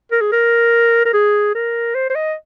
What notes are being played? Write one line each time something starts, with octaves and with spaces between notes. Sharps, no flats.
A#4
G#4
A#4
A#4
G#4
A#4
C5
C5
D#5